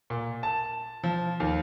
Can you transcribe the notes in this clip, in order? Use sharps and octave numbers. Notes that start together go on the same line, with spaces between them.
A#2
A5
F3
D#2